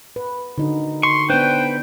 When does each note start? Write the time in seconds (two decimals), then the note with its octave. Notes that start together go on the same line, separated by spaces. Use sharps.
0.16 B4
0.58 D3 D#4 F#4
1.03 C6 C#6
1.30 B3 D4 B4 C5 G5